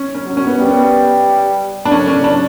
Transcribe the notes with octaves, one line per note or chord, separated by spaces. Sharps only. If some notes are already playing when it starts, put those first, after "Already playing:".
Already playing: C#4
C#4
F#3
C#4
B3
G3
B3
D4
D3 C#4
C#4
D4